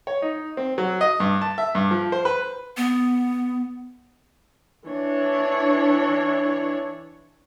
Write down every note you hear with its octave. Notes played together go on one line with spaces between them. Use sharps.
C#5
D#4
C4
F#3
D#5
G2
A5
E5
G2
F3
C5
B4
B3
E3 D4 C#5